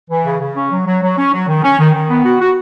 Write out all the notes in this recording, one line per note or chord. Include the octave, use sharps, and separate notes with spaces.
E3
C#3
C#3
C#4
F#3
F#3
F#3
C#4
F#3
D#3
C#4
D#3
D#3
B3
F#4
F#4